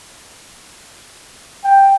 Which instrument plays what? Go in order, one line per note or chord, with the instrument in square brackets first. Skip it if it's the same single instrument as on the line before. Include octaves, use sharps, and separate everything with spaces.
[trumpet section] G5